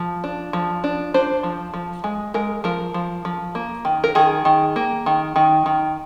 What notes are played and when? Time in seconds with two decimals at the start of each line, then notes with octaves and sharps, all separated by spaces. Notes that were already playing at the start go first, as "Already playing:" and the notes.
Already playing: F3
0.24 D4
0.53 F3
0.84 D4
1.14 D4 C5
1.43 F3
1.74 F3
2.04 G#3
2.34 G#3 A#4
2.64 F3 A#4
2.94 F3
3.25 F3
3.55 A#3
3.85 D#3
4.04 A#4
4.15 D#3 G#4
4.45 D#3
4.76 A#3
5.06 D#3
5.36 D#3
5.66 D#3